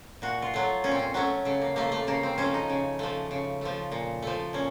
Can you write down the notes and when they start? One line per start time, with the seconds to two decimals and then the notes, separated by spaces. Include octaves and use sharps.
0.22 A#2 F#4
0.42 F4
0.54 F#3 A3
0.84 A#2 C#4
0.91 C4
0.99 C#4
1.14 F#3 A3 C#4
1.45 C#3 A3
1.62 A#3
1.76 F3 A3 A#3
1.92 A3
2.07 C#3 A#3
2.23 C4
2.38 F3 A3 C#4
2.54 D#4
2.69 C#3
2.99 F3 A3
3.31 C#3
3.61 F3 A3
3.92 A#2
4.22 F3 A3
4.53 A#2 C#4